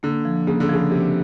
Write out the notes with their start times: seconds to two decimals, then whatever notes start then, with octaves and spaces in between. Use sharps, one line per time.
0.03 D3 A#3
0.25 F3
0.47 C#3 A#3
0.60 D3
0.69 C#3 F3
0.91 C3 F3